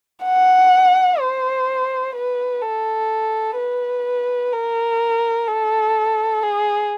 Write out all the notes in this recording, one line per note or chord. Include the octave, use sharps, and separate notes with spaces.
F#5
C5
B4
A4
B4
A#4
A4
G#4